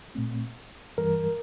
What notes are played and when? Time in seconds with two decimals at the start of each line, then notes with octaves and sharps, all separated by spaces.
0.15 A#2 A3 C4
0.98 G2 E3 G3 A#4